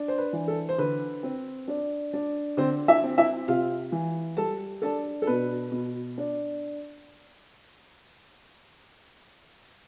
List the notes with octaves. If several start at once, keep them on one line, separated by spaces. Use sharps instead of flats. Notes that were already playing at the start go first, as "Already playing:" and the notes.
Already playing: D4
C5
B4
E3
A4
C5
D3 B4
C4
D4
D4
D3 C4 C5
E4 E5
C4
E4 E5
C3 F4 F5
E3
G3 A4 A5
D4 A4 A5
A4
B2 B4
B2
D4